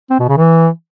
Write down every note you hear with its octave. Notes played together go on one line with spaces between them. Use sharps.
C4
B2
C#3
E3